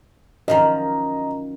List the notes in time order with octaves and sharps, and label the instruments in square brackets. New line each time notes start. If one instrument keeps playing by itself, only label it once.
[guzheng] F#2 D#3 F3 [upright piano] D#5 A#5